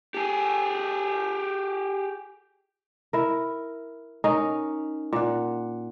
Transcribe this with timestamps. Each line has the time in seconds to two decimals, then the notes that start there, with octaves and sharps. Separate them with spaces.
0.14 G4 G#4
3.13 E4 A#4
4.24 C#4 D#4 A#4
5.13 A#2 F#5